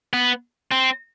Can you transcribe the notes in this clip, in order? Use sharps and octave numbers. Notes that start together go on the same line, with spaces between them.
B3
C4